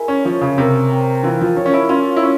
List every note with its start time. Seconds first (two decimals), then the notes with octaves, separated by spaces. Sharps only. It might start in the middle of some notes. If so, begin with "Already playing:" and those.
Already playing: G#3 E4 A#4
0.08 C#4
0.25 F3 C#5
0.41 C#3
0.58 C3 A#4
0.91 C4
1.23 E3 F4
1.41 F3
1.56 F3 C#5
1.66 C#4
1.74 E4
1.89 C#4 F4
2.16 E4
2.23 C#4